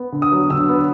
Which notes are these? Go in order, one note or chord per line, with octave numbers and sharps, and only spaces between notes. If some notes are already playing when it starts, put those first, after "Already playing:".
Already playing: B3
D3
D#6
F#3
D3 E6
B3